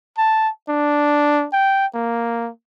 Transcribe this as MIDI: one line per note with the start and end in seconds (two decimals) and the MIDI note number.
0.17 0.49 81
0.69 1.47 62
1.53 1.86 79
1.94 2.50 58